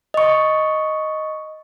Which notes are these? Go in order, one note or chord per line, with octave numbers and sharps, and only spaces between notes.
D#5 C#6